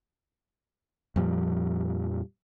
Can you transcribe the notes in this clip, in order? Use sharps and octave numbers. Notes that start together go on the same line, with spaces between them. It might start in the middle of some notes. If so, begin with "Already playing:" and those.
F2 A#2 F3 G3